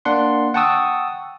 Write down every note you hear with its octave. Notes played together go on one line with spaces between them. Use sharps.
A#3 D4 F#5 C6
F#5 G5 A5 C#6 D#6 E6